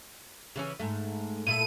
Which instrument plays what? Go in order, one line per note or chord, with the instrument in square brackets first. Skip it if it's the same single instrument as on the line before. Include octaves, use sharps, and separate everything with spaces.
[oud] C#3 E3 C#4
G#2 A3
[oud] A#2 E4 A4 [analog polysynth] D#7